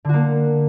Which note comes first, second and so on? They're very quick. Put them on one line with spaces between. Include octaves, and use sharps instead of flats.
D3 F#4 A#3